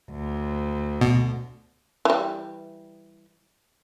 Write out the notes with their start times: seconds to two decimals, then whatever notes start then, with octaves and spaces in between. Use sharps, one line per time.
0.11 D2
1.01 B2
2.05 E3 G3